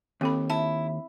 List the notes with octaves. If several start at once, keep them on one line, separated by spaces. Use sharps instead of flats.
D#2 C4 A4 B5
E4 A5